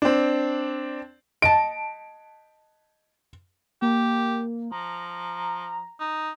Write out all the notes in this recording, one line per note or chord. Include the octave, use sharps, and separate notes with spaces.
C4 D4
D#5 A5 D7
A#3 G4
F3 A#5
D#4